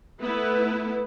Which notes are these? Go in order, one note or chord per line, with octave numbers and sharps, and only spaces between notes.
A3 B3 E4 B4